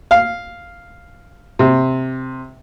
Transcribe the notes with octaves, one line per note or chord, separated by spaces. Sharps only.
F5
C3